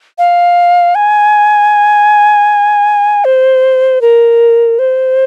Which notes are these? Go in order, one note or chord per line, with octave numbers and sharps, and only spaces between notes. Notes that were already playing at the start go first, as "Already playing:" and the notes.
F5
G#5
C5
A#4
C5